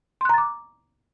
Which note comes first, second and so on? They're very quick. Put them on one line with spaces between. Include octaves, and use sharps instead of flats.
C6 F#6 A#5 A6 D6